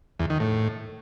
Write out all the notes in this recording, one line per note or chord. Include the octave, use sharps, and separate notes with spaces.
E2
D#3
A2